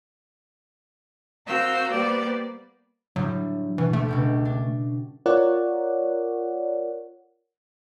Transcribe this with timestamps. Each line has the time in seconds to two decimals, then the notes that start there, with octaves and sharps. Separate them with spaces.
1.47 C4 F#4 A#4 F5 E6 G6
1.91 G3 A#3 B3 G4 C5 D5
3.16 A2 D3 F#3 G3
3.78 B2 E3
3.93 D2 A3
4.09 C#2 B2 G5
4.45 D4
5.26 F4 A#4 C#5 D5 F#5